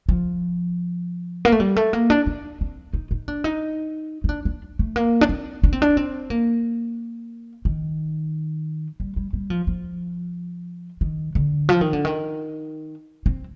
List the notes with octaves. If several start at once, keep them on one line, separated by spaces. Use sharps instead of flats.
F3
A#3
A3
G3
A3
A#3
D4
D4
C4
D#4
D#4
D4
D#4
D#4
D4
D4
A3
A#3
D4
C4
D4
C4
D4
C4
A#3
D#3
G3
G3
G3
F3
F3
D#3
D3
F3
D#3
D3
D#3
C4